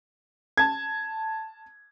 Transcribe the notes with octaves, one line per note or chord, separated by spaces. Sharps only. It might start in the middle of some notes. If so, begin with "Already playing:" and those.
A5 G#6